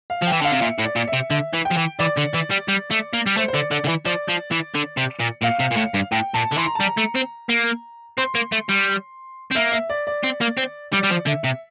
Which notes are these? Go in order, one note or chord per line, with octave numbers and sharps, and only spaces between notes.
F5
F3 G5
E3
D3 F5
C3
A#2 E5
A2
D5
A#2
E5
C3
D3 E5
E3
G5
F3
E3
E3 D5
D3
E3
G3
G3
A3
A#3
G3
A3 C5
C5
D3 D5
D3 D5
D3
E3
F3 D5
F3
E3
D3
C3
A#2
A#2 F5
C3
A#2
A2
G2
A2 G5
A#2 A5
D3
E3 C6
A#5
A5
G3
A#5
A3
C4
A#3
C4 C6
A#3
A3
G3
C4
A#3 E5
E5
D5
D5
C4
A#3
C4
G3 D5
G3
F3
D3 E5
C3